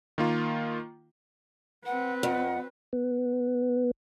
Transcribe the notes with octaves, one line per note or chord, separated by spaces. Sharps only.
D#3 A#3 F4
C4 B4 F#5
F2 F#5
B3